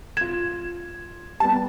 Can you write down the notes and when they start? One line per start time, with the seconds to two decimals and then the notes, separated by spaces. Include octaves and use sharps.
0.17 F4 G#6 E7
1.40 G3 B3 A5